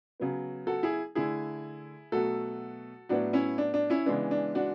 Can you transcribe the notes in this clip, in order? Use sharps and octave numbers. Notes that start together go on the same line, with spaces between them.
C#3 F#3 B3
F#4 A4
E4 G#4
D3 A3 E4 G#4
B2 F#3 A3 F#4 A4
A2 F#3 B3 D4 F#4
C#4 E4
D4
D4
C#4 E4
C#3 E3 G#3 B3 D4
D4
D4 F#4